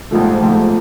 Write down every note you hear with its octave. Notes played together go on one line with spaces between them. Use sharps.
A#1 G#2 F3 A3
A#1 G#2 F3 A3